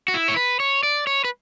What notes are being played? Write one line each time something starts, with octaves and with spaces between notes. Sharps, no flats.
F#4
E4
C#5
B4
C#5
D5
C#5
B4